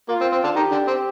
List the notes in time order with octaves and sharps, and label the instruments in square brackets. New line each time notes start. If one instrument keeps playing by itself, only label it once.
[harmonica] A#3 [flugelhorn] F4
[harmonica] C4
C4
D3 D4
[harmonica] D#3 D#4 [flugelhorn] G4
[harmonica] D3 D4
C4